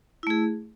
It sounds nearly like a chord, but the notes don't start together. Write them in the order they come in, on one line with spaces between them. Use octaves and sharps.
E4 A3 G#4